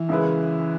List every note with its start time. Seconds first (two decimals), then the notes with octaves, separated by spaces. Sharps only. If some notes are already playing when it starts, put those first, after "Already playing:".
Already playing: E3
0.09 F#2 C#3 G#3 E4 B4